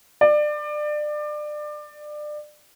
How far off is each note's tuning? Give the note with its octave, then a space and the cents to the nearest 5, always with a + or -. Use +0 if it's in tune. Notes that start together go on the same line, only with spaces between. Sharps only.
D5 +25